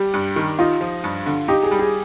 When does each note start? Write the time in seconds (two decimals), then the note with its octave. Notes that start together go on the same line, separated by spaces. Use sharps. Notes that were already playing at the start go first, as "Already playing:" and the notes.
Already playing: G3 G4
0.14 G2
0.36 D#3
0.59 D#4 F4
0.81 F3
1.04 G2
1.26 D3
1.48 D#4 G4
1.63 G#4
1.71 G3
1.79 G#4